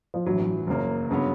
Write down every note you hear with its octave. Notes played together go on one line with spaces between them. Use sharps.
F3
A1 G2 E3 F#3
F#3
F#1 F#2 C#3 F#3 A#3
G1 C#3 F#3 B3